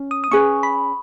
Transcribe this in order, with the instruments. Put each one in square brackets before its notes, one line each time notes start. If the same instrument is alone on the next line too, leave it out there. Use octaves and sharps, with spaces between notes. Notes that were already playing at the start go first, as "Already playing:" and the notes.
Already playing: [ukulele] C#4
[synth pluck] D#6
D#6
[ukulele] C#4 G#4 B4 [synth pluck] C#6
[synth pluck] B5